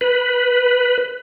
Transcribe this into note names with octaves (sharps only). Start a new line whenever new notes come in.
B4